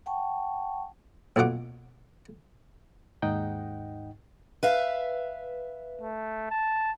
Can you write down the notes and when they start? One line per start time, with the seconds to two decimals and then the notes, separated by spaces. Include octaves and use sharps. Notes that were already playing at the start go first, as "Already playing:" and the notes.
0.06 F#5 G5 A5 C#6
1.36 A#1 F2 B2 F#5 D6
3.22 D#2 G#2 D#4 D#5 F#5 G5
4.63 B4 E5 F5
6.02 A3
6.50 A5